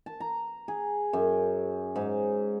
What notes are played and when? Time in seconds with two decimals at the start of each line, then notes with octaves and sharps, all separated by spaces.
0.06 A5
0.20 A#5
0.68 G#4
1.13 F#2
1.96 G#2